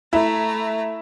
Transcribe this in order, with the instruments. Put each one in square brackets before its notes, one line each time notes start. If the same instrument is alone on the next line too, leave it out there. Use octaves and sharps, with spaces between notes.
[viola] A3 A#5 [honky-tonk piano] E4